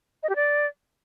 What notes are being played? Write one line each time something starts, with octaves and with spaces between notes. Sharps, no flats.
D#5
G4
D5